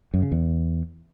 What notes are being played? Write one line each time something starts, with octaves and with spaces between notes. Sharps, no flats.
F#2
C#3
E2